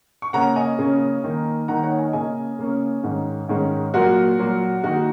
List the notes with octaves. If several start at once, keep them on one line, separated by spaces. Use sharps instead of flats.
C#6
C#3 A#3 C#4 F#5 A#5
D#5 G#5
C#3 A#3 C#4
D#3 A#3 D#4
D#3 A#3 D#4 F#5 A#5
C#5 F#5
D#5 G#5
C#3 A#3 C#4 D#5 G#5
C#3 A#3 C#4
G#2 D#3 G#3 C#4
G#2 D#3 G#3 C#4
A#2 F#3 A#3 F#4 A#4
A#2 F#3 A#3
D#3 A#3 D#4 F#4